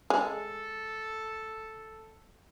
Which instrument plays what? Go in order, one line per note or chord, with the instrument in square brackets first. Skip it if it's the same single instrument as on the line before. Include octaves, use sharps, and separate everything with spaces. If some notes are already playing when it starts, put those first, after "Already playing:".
[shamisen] G#3 [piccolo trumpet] A4